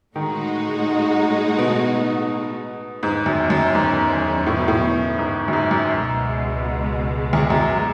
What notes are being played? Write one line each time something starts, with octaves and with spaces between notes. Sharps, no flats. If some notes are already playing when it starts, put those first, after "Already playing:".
A2 D#3 G#3 D#4 F#4
B2
E2 G#2 D#3 F#3 C#4
F#2
F#2
G#2
A2
B2
A2
G#2
F#2
G#2
F#2
C#2 B2 G#3
E2
F#2